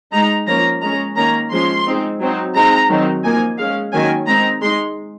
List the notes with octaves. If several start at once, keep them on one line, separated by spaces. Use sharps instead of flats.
G#3 D#4 A#5
F3 A#3 C#4 A#5
G#3 C#4 A#5
D#3 A#3 C#4 A#5
F3 G#3 C#4 C6
G#3 C4 D#4
F#3 C4 D#4
G#3 C4 D#4 A#5
D#3 F#3 C4 D#4
F3 A#3 D#4 G#5
G#3 C#4 F5
D#3 F#3 A#3 C#4 G#5
G#3 C4 D#4 A#5
G#3 D#4 C6